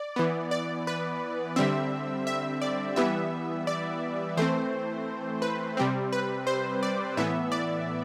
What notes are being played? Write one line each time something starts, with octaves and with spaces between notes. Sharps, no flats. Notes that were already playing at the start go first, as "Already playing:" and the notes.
Already playing: D5
E3 B3
D5
B4
D3 G3 C4 E5
E5
D5
E3 G3 B3 E5
D5
E3 A3 C4 C5
B4
C3 G3 C4
B4
C5
D5
A2 E3 B3 E5
D5